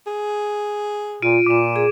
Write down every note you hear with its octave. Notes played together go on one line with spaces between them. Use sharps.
G#4
A#2 F4 D7 D#7
A#2 D6 E7
G#4